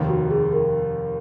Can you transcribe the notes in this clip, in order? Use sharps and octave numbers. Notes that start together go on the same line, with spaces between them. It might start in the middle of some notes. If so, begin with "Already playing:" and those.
Already playing: F1 D#2 D#3
F#4
G#4
G#4
A#4